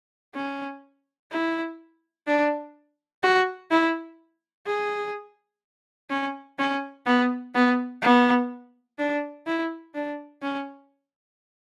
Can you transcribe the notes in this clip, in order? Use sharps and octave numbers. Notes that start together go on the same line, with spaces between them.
C#4
E4
D4
F#4
E4
G#4
C#4
C#4
B3
B3
B3
D4
E4
D4
C#4